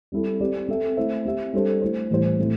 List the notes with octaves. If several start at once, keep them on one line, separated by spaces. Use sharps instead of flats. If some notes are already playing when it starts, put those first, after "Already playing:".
G3 C4 E4 A4
C4 G4 D5
C4 A4 E5
A3 E4 C5 E5
C4 G4 E5
G3 D4 A4 C5
A3 E4 C5
A2 E3 G3 E4 C5
A2 A3 C4 E4